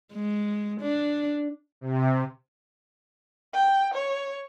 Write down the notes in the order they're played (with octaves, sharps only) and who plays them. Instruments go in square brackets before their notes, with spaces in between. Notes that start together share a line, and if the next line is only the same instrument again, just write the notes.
[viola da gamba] G#3
D4
[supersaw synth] C3
[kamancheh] G5
C#5